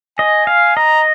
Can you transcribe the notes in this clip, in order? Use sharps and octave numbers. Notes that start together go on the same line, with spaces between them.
D#5 G#5
F5
D#5 A#5